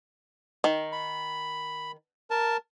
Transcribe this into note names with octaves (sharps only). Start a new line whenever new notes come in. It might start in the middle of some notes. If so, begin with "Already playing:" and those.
D#3
B5
A#4 A5